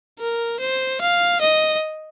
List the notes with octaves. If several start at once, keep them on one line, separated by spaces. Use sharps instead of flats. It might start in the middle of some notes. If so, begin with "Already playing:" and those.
A#4
C5
F5
D#5